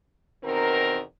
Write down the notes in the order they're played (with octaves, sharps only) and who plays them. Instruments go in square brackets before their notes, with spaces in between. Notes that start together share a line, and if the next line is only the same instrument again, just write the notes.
[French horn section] E2 B2 D#3 C4 A#4